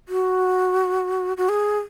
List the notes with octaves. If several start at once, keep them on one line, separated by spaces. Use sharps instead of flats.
F#4
F#4
G#4